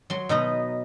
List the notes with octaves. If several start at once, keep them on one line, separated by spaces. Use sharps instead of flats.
F#3 C6
B2 D#4 B4 D#5 A#5